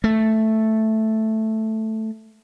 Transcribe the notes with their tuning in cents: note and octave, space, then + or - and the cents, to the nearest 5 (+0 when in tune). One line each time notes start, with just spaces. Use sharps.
A3 +0